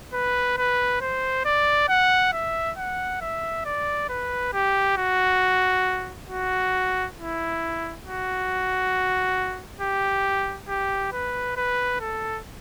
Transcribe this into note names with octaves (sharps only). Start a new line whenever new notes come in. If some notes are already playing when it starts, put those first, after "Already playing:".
B4
B4
C5
D5
F#5
E5
F#5
E5
D5
B4
G4
F#4
F#4
E4
F#4
G4
G4
B4
B4
A4